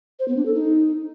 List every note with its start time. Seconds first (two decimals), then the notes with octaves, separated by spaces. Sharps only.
0.20 C5
0.28 B3
0.37 D4
0.46 A4
0.54 D#4